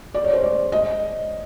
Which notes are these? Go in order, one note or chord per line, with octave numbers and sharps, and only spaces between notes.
D5
C#5
C5
D5
D#5